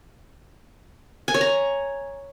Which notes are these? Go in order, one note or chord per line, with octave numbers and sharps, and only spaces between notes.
G#5
C#5
A#5